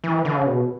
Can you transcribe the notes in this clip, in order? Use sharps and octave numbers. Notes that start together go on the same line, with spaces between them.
E3
D3
C#3
B2